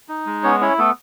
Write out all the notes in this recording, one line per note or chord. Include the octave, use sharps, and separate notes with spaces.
D#4
G#3
B3 C#4 C#5
C#4 E4 C#5
A3 B3 A4